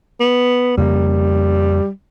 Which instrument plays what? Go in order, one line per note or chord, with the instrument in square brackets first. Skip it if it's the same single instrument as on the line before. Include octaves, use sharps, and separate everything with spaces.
[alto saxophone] B3
[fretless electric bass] F2 C#3 A#3 [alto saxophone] G3